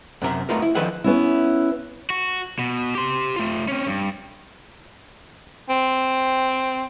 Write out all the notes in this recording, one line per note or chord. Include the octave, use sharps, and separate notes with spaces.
F#2 C3 A#4 E5
A3 B3 D#4 F4 A#4
E4
D3 D#3 F3 B4 E5 F#5
B3 C#4 E4
F#4
B2
G4 C6
A3 F4
C4 C#4
G2
C4